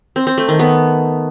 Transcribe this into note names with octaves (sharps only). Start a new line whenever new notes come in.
C4
C4
A3
D#3
B3